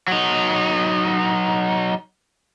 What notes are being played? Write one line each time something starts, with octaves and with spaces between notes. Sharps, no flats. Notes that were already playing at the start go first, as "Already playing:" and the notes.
F#3 D#4